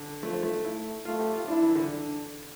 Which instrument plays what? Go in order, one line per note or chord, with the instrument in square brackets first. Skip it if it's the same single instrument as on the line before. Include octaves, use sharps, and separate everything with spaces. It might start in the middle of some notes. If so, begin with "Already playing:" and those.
Already playing: [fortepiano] D3
[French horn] F3 [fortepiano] A3
[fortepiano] A3
[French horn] A3 [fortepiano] E4
[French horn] A3 [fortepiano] F4
[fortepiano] G4
F4
[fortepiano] D4 [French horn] E4
[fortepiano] E3
D3
[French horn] D4